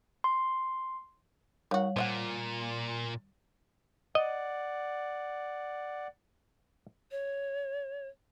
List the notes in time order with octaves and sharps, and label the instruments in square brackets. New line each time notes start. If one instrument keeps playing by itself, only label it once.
[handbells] C6
[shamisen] D#3 F#4 [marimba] G3 C#5
[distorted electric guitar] A#2 [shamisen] F3 E5 F#5
[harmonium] D5 F#5 [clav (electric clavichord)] D#5
[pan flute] C#5